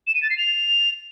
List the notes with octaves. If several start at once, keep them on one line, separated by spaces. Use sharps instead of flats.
E7
D#7
A6
C7
F7